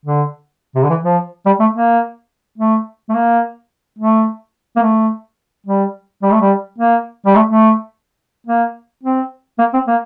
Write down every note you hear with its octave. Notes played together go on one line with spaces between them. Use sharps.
D3
C3
D3
E3
F3
G3
A3
A#3
A3
A3
A#3
A3
A#3
A3
G3
G3
A3
G3
A#3
G3
A3
A3
A#3
C4
A#3
C4
A#3